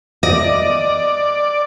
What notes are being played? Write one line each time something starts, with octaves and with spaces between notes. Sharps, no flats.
D5 D#5